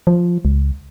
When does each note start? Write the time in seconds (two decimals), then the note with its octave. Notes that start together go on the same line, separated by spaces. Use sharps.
0.07 F3
0.45 C#2